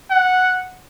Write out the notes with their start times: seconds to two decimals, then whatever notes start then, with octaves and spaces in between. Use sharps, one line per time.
0.10 F#5